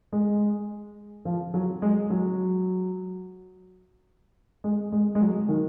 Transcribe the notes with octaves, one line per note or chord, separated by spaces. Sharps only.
G#3
F3
F#3
G#3
F#3
G#3
G#3
G#3
F#3
D#3